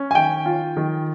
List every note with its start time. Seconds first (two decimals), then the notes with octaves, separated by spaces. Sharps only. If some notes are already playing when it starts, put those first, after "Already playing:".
Already playing: C#4
0.11 G#5
0.15 D#3 G5
0.46 F4
0.77 D#3